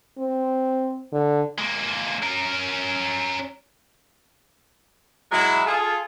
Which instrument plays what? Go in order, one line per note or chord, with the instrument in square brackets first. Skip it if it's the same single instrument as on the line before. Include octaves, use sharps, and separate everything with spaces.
[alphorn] C4
D3
[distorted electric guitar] G#3 A#3
C#4 A#4
[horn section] F#3 G#3 E4
F4 G#4 A4